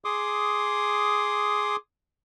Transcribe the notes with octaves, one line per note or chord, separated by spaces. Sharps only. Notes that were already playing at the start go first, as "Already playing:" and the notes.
G#4 C6 D6 D#6